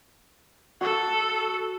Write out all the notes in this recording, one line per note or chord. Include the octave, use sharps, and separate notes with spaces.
F#4 A4